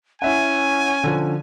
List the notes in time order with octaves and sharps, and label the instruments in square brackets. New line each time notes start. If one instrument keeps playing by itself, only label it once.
[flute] C#4 [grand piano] E4 E5 F#5 [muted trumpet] G#5
[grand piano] D3 F3